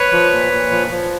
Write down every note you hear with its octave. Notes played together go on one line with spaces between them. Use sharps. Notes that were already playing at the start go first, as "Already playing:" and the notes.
Already playing: B4 C#5
F3
A#2
A#2
F3
F3